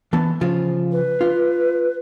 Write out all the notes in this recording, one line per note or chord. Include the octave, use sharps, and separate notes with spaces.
E3 B3 A5
C#3 F3 F4
B4
F4